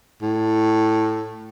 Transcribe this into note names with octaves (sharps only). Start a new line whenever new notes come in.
A2